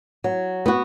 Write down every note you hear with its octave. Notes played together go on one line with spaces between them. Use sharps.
F#3
B3 F#4